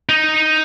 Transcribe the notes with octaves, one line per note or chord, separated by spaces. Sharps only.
D#4